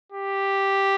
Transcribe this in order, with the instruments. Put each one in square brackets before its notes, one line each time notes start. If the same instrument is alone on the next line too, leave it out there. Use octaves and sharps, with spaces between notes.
[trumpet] G4